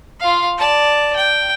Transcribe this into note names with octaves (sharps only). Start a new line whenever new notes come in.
F4 F5
D5 A5
G5